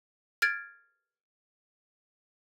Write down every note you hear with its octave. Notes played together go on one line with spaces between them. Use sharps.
F6 G#6 A6 D7